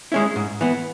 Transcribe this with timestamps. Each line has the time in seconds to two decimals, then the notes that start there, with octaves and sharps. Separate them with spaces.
0.12 G#3 C#4 E4
0.36 G#2
0.61 E3 B3